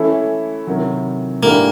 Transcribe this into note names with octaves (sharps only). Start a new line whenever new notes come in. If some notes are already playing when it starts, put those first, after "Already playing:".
Already playing: E3 A3 C#4 E4 A4
C3 D#3 F#3
G#2 E3 A3 A#3 D4 G4